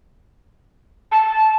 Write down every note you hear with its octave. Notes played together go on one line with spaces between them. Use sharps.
A5